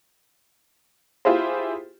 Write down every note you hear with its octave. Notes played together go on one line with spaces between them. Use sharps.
E4 F4 G4 G#4 C5